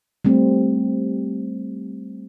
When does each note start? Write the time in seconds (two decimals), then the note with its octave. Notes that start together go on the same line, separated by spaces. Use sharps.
0.25 G3 A3 C4